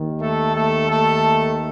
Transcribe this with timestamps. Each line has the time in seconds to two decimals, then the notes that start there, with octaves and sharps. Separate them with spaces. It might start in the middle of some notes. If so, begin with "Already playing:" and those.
Already playing: D#2 D#3
0.21 A3 A4
0.55 A3 A4
0.90 A3 A4